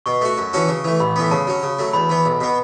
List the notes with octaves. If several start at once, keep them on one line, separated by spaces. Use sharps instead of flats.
B2 C#6
A3 F#4
F#2
E3 C#4 F#4 A4
C#3
E3 A3
A1 B5
A2 E3 B3
C#3 A5
F#3 C#4
C#3
F#3 A3
E2 B5
E3 B3
B1
B2 B3